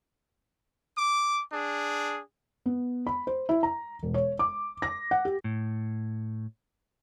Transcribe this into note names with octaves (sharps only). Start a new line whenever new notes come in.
D6
D4 G#4
B3
B5
C5
E4
A#5
E1
C#5
D6
A#6
F#5
G4
A2